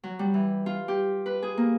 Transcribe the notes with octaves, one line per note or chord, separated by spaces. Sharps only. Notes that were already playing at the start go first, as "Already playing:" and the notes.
F#3
G3
E3
F4
G4
B4
G#4
A#3